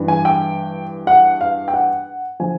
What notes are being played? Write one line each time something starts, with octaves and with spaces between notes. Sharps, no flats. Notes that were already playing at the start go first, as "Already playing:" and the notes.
Already playing: G2 E3
G#5
G5
F#5
F5
G5
F#5
D3 F3 G#5